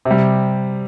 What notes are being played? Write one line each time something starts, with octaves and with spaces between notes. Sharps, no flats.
C3
G3